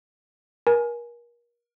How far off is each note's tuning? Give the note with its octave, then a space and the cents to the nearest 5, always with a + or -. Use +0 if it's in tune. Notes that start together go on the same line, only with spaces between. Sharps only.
A#4 +35 G#5 +10